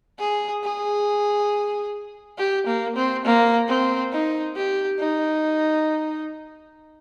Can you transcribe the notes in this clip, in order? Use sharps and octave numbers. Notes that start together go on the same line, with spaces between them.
G#4
G#4
G4
A#3
C4
A#3
C4
D#4
G4
D#4